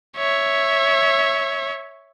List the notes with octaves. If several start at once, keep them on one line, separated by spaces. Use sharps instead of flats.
C#5 E5